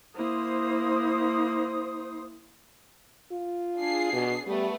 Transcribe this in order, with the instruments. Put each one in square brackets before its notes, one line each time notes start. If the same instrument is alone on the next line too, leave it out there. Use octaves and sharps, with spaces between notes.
[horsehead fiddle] A#3 E4 [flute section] C5 D#6
[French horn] F4
[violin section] D4 G#4 C7
[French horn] B2
[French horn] G3 [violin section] A3 B3 B4